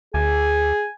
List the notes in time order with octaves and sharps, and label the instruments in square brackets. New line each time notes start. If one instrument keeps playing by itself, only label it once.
[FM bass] D2 [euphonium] G#4 [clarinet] G#5